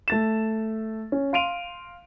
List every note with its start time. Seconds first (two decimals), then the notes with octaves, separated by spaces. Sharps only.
0.08 A3 A6 E7
1.12 C#4
1.33 F5 C6 D7 D#7 F7